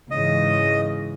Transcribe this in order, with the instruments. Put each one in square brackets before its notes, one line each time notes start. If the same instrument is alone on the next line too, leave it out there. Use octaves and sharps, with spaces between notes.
[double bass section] G#2 C#3 E3 [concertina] D#5